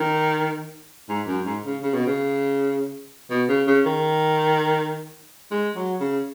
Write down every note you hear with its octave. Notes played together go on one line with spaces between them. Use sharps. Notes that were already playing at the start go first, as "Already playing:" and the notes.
Already playing: D#3
G#2
F#2
G#2
C#3
C#3
B2
C#3
B2
C#3
C#3
D#3
G#3
F#3
C#3